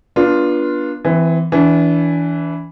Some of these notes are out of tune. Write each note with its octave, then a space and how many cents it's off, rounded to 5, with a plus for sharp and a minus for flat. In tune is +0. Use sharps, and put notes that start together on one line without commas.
B3 -30 D4 +0 F4 +0
E3 +0 C4 -30
E3 -5 D4 -35